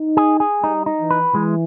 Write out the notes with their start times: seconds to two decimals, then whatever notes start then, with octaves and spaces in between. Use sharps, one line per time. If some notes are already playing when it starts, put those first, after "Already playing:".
Already playing: D#4
0.17 G#4
0.40 G#4
0.63 G3 D#4
0.86 D#4
0.99 E3
1.11 B4
1.34 E3 G#3